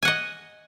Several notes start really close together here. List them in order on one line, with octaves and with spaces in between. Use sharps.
G#5 F#5 D#5